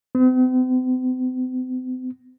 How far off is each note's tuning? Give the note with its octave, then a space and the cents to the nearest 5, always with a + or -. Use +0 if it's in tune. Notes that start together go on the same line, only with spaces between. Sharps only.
C4 -45